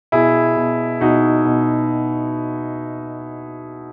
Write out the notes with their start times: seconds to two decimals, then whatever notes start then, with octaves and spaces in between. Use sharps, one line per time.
0.12 B2 E4 G#4
0.56 B2
1.01 B2 D#4 F#4
1.46 B2